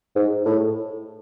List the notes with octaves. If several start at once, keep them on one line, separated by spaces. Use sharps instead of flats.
G#2
A2